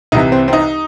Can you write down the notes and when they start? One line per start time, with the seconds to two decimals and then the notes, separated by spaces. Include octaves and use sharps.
0.12 C2 C3 E3 D#4
0.32 C4
0.48 C4
0.53 D#4